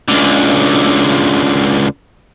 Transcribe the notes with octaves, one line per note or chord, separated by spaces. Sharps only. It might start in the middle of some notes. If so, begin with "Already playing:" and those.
C#2 D3